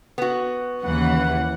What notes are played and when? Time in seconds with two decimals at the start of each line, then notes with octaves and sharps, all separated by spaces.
0.18 B3 F#4
0.83 D#2 C#3 E3 F#5